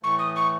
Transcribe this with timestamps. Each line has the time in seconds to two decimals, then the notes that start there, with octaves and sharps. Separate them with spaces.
0.03 A2 E3 A3 C#6
0.19 D#6
0.36 C#6